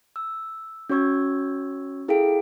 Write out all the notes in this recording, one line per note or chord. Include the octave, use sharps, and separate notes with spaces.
E6
C#4 F#4 C#5 C#6 E6 G#6
E4 G#4 A4 F5 G5 D7